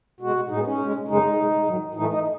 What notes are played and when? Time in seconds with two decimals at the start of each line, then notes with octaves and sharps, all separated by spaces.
0.20 B2 G#3 F#4
0.49 A2 G#3 D#4
0.58 B3
0.64 C#4
0.78 B2 G#3
1.08 F#2 C#3 G#3 D#4
1.37 B2 G#3
1.66 G#2 D#3 F#3
1.94 A2 E3 A3 D#4
2.09 D#4